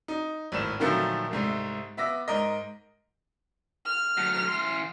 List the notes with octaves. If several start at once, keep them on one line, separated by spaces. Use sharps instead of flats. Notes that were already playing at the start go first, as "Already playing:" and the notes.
D#4
G#1 A2 E7
A#2 D3 D#3 F3 F#3 A3
C2 G#2 A3
B3 E5 D6 A#6
G#2 A#4 D#5
F6
F#3 A3
E3 C6